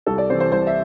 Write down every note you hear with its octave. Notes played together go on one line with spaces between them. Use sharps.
C2 A4
D5
C3 E3 C5
C5
C2 C5
E5